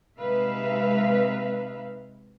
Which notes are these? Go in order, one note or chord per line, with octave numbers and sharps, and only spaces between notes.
C3 G#3 D#4 B4 E5 F5